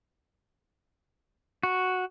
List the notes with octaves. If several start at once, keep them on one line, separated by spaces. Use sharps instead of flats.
F#4